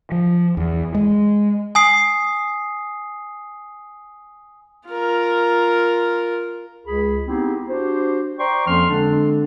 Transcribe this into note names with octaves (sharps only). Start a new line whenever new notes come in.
F3
E2
G#3
G#5 D#6 C7
F4 A#4
C#2 G#4 B5
B3 C4 D#4 E4 G4 G#4
D4 F#4 G4 C5
C5 D5 G5 A#5 C6 C#6
F2 F3 A#3 C#4 C6 F6
D3 G#3 C4 D4